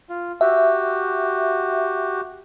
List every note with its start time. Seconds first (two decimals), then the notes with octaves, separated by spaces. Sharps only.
0.09 F4
0.41 F#4 G4 E5